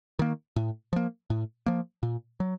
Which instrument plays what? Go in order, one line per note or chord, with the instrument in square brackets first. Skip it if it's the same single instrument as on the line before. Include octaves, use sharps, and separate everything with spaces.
[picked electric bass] D#3 A#3
A2
F3 A#3
A2
F3 A#3
A#2
F#3